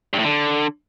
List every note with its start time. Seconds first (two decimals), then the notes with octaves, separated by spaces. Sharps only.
0.13 G2
0.19 A2
0.24 D3